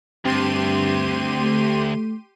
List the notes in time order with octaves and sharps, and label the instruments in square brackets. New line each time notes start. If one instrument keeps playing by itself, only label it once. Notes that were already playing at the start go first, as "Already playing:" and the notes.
[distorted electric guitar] D2 [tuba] G2 [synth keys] C4 [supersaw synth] G4 C6 D#7
[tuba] A3